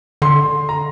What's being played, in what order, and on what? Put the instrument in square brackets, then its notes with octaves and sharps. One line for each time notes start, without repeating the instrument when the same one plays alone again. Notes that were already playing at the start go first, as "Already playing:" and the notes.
[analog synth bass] D3 [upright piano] C6
[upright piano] A#5